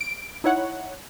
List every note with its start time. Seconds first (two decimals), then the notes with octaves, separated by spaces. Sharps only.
0.01 D7
0.44 D#4 E4 C#5 F#5